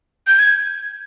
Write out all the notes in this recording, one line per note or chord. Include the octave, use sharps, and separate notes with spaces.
G6
G#6